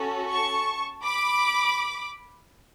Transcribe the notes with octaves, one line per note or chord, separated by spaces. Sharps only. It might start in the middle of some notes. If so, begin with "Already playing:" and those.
Already playing: C#4 F#4 A4
A5 C#6
B5 D6